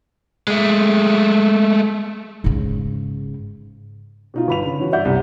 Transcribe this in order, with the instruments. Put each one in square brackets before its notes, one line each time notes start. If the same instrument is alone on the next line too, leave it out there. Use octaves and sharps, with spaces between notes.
[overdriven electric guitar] G#3 A3
[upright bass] G#2 C#3
[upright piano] B2 D#4 F4
G1 B5 F7
C#3
E3 C#4 F#4
G2 D5 E5 F#5 G6
C2 G3